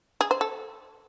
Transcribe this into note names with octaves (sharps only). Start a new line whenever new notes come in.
G#4
C5
A4